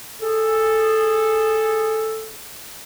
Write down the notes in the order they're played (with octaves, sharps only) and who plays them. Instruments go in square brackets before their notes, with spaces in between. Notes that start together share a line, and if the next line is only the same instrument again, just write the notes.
[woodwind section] G#4 A4